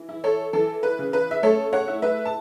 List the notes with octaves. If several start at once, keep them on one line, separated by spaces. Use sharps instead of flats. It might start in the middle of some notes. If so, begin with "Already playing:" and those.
Already playing: E3
E4
A4 C#5
E3 A4
B4
C#3
B4
E5
A3 A4 C#5
C#5 F#5
E4
B4 E5
A5